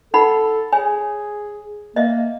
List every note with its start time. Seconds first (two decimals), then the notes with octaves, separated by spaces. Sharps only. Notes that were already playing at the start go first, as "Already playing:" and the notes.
0.14 D#4 A4 F#5 B5
0.72 G#4 C#5 G#5
1.96 A#3 D#5 E5